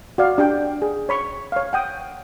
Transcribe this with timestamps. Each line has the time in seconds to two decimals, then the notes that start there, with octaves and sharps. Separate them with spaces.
0.18 F#4 D5 F5
0.38 D4 G4 G5
0.82 G#4
1.09 C#5 B5 C#6
1.52 C#5 F5
1.73 F#5 G5 D#6